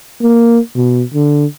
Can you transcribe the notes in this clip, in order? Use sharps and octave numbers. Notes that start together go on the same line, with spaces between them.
A#3
B2
D3